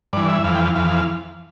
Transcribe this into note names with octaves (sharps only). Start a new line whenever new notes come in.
G2 E3 D5
E5
F2 E3 F5
G5
F5
F2 E3 F5